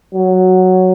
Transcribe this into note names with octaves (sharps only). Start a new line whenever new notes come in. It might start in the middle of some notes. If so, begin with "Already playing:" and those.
F#3